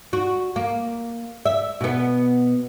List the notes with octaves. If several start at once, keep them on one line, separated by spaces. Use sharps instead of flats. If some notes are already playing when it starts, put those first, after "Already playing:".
F#4
A#3
E5
B2 B3